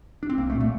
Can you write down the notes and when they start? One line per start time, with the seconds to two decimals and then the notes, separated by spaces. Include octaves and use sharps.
0.23 D4
0.30 C4
0.38 C2 A#3
0.50 A3
0.55 A#2
0.61 A3